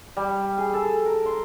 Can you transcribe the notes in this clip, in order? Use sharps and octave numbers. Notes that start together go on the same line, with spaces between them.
G3
G#4
A4
A#4
C6